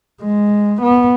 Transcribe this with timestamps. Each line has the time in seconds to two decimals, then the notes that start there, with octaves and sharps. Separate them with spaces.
0.22 G#3
0.82 B3